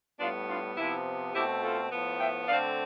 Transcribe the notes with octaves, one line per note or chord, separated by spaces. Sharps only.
A2 G3 B3 D4 F4
D4 F4
C3 F3 B3 E4
B2 A3 C4 E4 G4
F4 A4
A2 F3 B3
E5 G5
D3 A3 C4 D5 F5